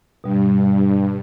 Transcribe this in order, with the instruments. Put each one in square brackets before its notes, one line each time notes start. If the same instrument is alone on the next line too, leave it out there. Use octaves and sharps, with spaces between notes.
[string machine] G2 [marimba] B2 G3